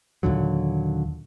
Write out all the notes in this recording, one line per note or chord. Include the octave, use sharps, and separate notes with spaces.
D#2 A#2 D3 F#3